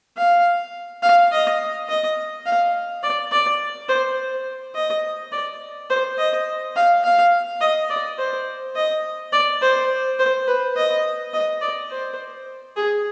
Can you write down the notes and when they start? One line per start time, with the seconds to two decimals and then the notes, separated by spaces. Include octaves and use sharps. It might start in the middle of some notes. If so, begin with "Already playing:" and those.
0.17 F5
1.02 F5
1.31 D#5
1.89 D#5
2.46 F5
3.03 D5
3.31 D5
3.89 C5
4.75 D#5
5.32 D5
5.90 C5
6.18 D#5
6.76 F5
7.04 F5
7.61 D#5
7.90 D5
8.18 C5
8.76 D#5
9.33 D5
9.62 C5
10.19 C5
10.47 B4
10.76 D#5
11.34 D#5
11.61 D5
11.90 C5
12.76 G#4